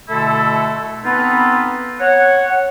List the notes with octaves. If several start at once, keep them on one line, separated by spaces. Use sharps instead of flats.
B2 D3 A3 E4 A4
B3 C4 D#4 F4 A4 B4
C#5 F#5